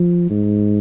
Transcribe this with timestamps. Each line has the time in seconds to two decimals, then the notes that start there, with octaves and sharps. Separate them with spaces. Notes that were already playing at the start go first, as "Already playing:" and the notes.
Already playing: F3
0.30 G#2